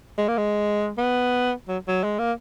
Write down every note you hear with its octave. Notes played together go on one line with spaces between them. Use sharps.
G#3
A#3
G#3
B3
F#3
F#3
G#3
A#3